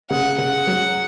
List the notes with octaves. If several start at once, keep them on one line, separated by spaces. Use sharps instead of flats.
C#3 F#5
C#3 F#5
F#3